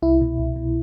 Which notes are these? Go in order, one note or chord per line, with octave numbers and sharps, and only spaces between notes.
C2 E4
B2
C2
B2